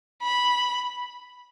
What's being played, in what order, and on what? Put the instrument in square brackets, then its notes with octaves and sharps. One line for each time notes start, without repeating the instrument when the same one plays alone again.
[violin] B5